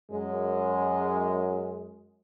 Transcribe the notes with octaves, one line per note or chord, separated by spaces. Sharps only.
F#2 G#3